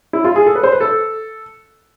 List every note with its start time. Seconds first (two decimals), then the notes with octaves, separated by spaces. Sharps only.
0.13 E4
0.25 F4
0.36 G#4
0.47 A4
0.55 B4
0.63 C5
0.72 B4
0.81 A4